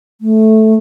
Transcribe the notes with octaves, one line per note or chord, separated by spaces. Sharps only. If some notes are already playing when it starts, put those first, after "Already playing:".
A3